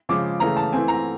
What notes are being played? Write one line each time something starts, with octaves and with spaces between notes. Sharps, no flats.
C#3 F3 G#3 D6
C#3 E3 A3 A#5
A5
E3 A3 C4 G#5
A#5